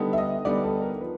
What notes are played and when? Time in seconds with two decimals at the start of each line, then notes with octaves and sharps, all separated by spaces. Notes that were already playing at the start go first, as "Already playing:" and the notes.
Already playing: D3 G3 B3 D#4
0.13 E5
0.18 D#5
0.45 D3 G3 B3 D#4 D5
0.64 A4
0.82 A#4
1.00 F3 B4